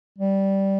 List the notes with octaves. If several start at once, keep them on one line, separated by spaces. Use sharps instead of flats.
G3